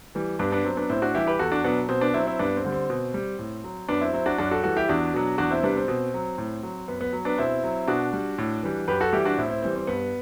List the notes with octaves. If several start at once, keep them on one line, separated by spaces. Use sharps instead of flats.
E3 G3
G2 B3 D4
B3 D4
F#3 C4
B3 D4
A2 C4 E4
D4 F#4
E3 G3 E4 G4
G4 B4
E2 F#4 A4
D4 F#4
B2 F#3 B3 D4
B2 C4
B3 D4
F#3 C4 E4
C4 E4
G2 B3 D4
C4
D3 G3
C4
B2
G3
A2
F#3
F#2 B3 D4
C4 E4
F#3 C4 E4
D4 F#4
F#2 D4 F#4
F#4 A4
E3 G3 F#4 A4
E4 G4
E2 D4 F#4
B2 F#3
E2 D4 F#4
C4 E4
C3 G3 B3 D4
C4
B2 C4
F#3
A2
F#3
F#2 B3
B3
F#3
B3 D4
B2 C4 E4
F#3
B2 D4 F#4
G3
A2
E3 G3
F#2 G4 B4
F#4 A4
E3 G3 E4 G4
D4 F#4
A2 C4 E4
C4 E4
E3 G3 C4
C4
G2 B3